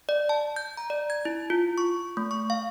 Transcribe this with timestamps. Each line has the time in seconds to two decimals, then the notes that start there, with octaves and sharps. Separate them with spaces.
0.09 D5
0.29 A5
0.56 G6
0.77 A#5
0.90 D5
1.10 G#6
1.25 E4
1.50 F4
1.78 C#6
2.17 A3
2.31 C#6
2.50 F5